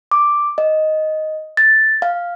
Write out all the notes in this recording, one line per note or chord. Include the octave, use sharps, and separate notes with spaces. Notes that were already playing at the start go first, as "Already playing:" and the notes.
D6
D#5
A6
F5